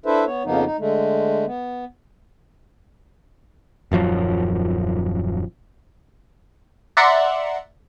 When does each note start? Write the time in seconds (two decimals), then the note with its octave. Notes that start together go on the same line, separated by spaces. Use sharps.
0.06 D4 E4 A4 B4 C5 E5
0.26 B3 C#5
0.45 F2 C#3 F3 A#3 B3 D#4
0.65 D#4
0.79 D3 G#3 A3
1.46 B3
3.92 D#1 F#2 F3 F#3
6.97 D5 E5 F#5 A#5 C6 C#7